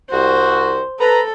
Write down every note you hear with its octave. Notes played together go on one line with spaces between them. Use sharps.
C2 F#4 C5
A4 B4 A#5